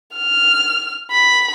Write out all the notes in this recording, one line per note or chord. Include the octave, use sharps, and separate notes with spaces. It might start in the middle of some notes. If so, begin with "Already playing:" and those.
F6
B5